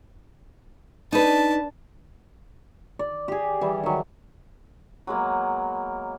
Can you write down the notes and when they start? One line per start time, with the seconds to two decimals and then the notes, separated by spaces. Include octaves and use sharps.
1.12 D4 D#4 B4 A5
2.99 D5
3.28 G4 G#4
3.61 E3 G3
3.83 D#3 F#3
5.07 F#3 G#3 A#3 B3